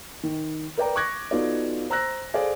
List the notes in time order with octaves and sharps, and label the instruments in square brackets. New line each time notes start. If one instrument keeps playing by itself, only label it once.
[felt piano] D#3
A#4 B4 D5 G5 A#5
C#6 D6 F#6 G#6 A#6
B3 D#4 F4 F#4 A4 D5
C5 A#5 E6 F#6 A#6
G#4 A4 C5 D5 F5 G#5